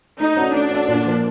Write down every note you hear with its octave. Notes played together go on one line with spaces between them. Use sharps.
A3 D#4
C#4 F#4 A4 D5
A3 D4
C#4 F#4 A4 D5
A#2
F3 A#3